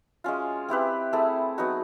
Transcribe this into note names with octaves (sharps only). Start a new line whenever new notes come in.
G#3 C#4 F4
C4 E4 G4 B4
A3 C4 E4 G#4
F#3 B3 D#4 F#4